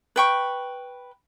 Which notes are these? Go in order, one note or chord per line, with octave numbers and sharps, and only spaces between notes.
B4 G5 C#6